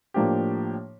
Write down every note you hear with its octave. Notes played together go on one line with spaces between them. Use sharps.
A2 F3 A#3 D4 G4